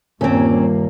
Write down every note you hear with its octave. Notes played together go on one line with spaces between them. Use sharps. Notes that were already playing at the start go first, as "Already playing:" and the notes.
D#1 G2 G3 A#3 C4 C#4 G#6